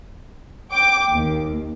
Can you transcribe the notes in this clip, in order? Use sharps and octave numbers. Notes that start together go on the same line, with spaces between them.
G5 D6
D#2